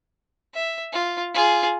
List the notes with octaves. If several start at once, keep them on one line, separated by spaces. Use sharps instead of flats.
E5
F4
F4 G#4